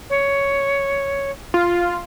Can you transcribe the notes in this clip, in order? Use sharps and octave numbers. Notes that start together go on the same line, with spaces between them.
C#5
F4